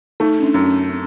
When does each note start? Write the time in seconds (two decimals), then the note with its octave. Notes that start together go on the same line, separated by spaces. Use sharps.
0.20 A3 D#4
0.39 C#4
0.43 D4
0.54 F#2
0.66 C#4
0.89 C4